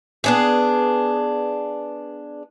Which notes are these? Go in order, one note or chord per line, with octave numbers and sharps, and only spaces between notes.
B3 D4 G#4